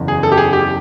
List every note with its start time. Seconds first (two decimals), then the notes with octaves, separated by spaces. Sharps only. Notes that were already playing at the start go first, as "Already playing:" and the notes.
Already playing: F#1 E2 C#3
0.08 G#4
0.23 A4
0.32 G4
0.37 G#4
0.53 G4